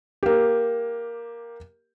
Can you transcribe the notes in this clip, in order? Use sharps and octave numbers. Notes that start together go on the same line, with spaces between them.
A#3 G4